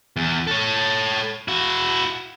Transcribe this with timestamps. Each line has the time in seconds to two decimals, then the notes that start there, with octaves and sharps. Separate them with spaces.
0.16 E2
0.47 A4 C#5
1.48 E4 F#4